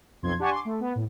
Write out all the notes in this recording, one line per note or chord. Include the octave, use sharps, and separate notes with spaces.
B1 F2 C6 G#6
D4 G4 F#5 G#5 A5 C#6
C6 D6
A3
B3
A2